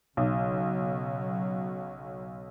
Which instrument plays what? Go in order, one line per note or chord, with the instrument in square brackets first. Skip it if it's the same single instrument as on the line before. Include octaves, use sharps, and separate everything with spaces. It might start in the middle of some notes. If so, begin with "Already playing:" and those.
[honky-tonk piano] B1 [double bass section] C#3 F#3